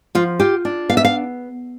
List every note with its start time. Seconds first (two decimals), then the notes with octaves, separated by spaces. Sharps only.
0.15 F3 F4
0.40 F4 G4
0.65 D4
0.89 B3 F5
0.97 E5
1.05 F5